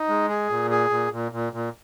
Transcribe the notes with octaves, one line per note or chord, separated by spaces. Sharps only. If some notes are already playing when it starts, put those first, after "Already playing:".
Already playing: D#4
G#3
G#4
A#2
G#4
A#2
A#2
A#2
A#2